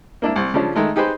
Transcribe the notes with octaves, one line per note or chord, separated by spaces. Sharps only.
A#3 D4 E4
C2
C#3 F3 G3 C#4 D4
D#3 G#3 A3
D#4 G4 G#4 B4 C5